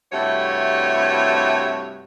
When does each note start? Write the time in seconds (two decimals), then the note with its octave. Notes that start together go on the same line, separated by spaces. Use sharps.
0.12 G2 C3 A3 E4 F#4 C#5